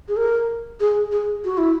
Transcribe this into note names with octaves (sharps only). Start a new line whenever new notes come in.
G#4
A#4
G#4
G#4
F#4
E4